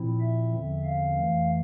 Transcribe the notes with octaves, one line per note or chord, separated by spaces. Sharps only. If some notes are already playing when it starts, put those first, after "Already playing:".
Already playing: A#2 F3 C4 E4
E5
E2 D3 F3 C4
F5
F2 E3 A3